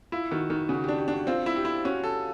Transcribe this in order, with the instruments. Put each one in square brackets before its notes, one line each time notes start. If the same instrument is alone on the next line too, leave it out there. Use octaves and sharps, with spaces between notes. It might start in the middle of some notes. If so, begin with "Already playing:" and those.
[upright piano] E4 [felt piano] F4
[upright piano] D#3 [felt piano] F#4
[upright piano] D#3 [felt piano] F#4
[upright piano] C#3 [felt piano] F#4
[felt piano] G4
[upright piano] D4
[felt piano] G4
[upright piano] D4 [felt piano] F#4
[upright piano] C4 [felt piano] F4
[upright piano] E4
[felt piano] G4
[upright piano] E4
[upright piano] C#4 [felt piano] F#4
[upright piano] A4